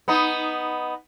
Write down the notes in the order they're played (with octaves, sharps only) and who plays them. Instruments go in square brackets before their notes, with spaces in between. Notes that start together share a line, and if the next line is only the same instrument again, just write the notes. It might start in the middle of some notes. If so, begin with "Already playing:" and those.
[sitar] B3 D#4